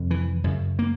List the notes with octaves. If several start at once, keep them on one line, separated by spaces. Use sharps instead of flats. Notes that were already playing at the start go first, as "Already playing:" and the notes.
Already playing: F2 C3
E3
F#2 C#3
A#3